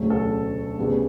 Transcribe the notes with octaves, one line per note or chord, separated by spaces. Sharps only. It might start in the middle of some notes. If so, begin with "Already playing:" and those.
Already playing: E1 D2 C#3 F#3 A3
A4
D2 C#3 G3 B3